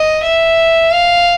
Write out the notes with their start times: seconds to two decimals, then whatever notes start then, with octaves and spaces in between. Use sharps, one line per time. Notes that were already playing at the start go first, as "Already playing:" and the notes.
Already playing: D#5
0.23 E5
0.93 F5